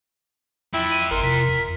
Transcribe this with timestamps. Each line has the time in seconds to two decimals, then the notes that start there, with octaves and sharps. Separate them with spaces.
0.74 E4 F4 G5
0.91 D#7
1.11 G1 A#4 C6
1.23 C3 B6
1.49 F2